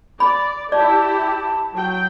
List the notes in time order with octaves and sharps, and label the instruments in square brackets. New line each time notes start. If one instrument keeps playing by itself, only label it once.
[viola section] D5 [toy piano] B5
[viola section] E4 G4 [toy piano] D5 [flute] A5
[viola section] F#3 G5